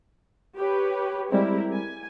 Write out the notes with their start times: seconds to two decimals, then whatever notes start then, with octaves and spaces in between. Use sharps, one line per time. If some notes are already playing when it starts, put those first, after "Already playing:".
0.57 G4 B4 C#5
1.32 G3 G#3 C4 E4 G4 A#4
1.72 G#5